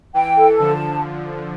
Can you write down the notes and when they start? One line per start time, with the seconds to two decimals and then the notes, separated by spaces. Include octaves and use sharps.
0.14 E3 G5
0.37 A4
0.59 D3 F3 A5